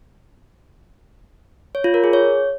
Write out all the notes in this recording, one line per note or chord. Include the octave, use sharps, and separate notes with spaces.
C#5
F4
A#4
G#4
C#5